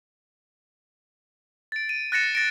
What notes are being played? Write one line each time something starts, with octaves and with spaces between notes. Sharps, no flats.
A6 D7
D#7
F#6 A6 A#6 C#7 E7
A6 A#6 C#7 D7